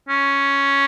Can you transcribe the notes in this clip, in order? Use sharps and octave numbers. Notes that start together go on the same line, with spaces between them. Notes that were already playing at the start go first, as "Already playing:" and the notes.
C#4